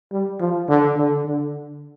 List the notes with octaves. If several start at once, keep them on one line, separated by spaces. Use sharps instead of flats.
G3
F3
D3
D3
D3